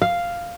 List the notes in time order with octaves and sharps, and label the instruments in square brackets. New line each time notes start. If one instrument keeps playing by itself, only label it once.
[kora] F5